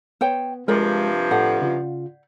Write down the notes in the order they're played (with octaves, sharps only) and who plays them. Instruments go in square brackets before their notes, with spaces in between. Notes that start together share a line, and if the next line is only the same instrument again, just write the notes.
[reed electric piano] B3 [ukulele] C5 C#5 G5
[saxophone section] G2 C3 F3 [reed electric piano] G#3 [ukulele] A#4 C5 D5
[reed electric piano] A2 A4 [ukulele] D5 F#5
[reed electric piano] C#3 F4